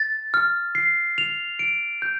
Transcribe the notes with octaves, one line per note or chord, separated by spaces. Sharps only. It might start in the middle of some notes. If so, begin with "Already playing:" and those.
Already playing: A6
F6
C7
F7
D7
G6